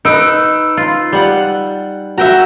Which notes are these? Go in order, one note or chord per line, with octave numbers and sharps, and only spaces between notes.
D#4 B4 E6 D7
F4
G3 F#5
F#4 E5 G5 A#5